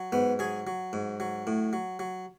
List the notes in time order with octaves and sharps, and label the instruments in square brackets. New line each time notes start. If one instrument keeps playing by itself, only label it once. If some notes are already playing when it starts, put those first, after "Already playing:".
Already playing: [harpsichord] F#3
G#2 B3
F#3 G#4
F#3
G#2
F#3
A2
F#3
F#3